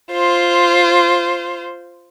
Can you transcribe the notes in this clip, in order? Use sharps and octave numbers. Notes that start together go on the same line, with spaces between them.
F4 C5